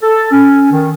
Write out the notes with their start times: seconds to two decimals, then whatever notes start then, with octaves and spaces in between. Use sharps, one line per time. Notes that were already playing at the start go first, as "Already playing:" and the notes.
0.01 A4
0.31 C#4
0.71 D#3